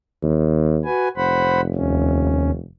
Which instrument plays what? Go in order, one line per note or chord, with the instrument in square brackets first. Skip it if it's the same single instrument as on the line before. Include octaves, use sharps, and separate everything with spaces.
[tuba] D#2
[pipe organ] F#4 B4 G#5
[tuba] F1 [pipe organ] C5 F#5 B5
[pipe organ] D#2 C#4